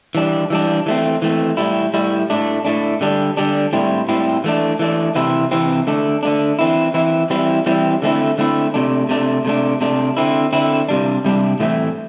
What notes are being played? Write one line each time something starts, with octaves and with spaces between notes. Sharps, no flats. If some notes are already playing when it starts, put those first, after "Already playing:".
E3 G3 D4
E3 G3 D4
E3 A3 C4
E3 A3 C4
A2 G3 E4
A2 G3 E4
A2 A3 D4
A2 A3 D4
D3 G3 D4
D3 G3 D4
A2 G3 C4 E4
A2 G3 C4 E4
E3 A3 D4
E3 A3 D4
C3 E3 C4 E4
C3 E3 C4 E4
D3 A3 D4
D3 A3 D4
E3 C4 E4
E3 C4 E4
E3 G3 C4 E4
E3 G3 C4 E4
D3 A3 C4 E4
D3 A3 C4 E4
C3 A3 D4
C3 A3 D4
C3 A3 D4
C3 A3 D4
D3 C4 E4
D3 C4 E4
C3 G3 D4
C3 G3 D4
A2 E3 A3 C4 E4